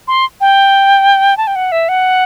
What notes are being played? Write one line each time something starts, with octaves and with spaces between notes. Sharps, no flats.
C6
G5
A5
G5
F#5
E5
F#5